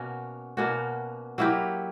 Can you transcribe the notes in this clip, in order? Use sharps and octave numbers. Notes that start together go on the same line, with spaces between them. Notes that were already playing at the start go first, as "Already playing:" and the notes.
Already playing: B2 A#3 C#4 F#4
B2 A#3 C#4 F#4
F#3 A#3 E4 G4